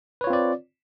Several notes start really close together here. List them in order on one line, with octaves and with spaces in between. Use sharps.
B4 C#5 F4 C4 D5